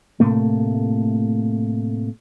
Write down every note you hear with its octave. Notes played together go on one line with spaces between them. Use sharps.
A2 C3 A3 A#3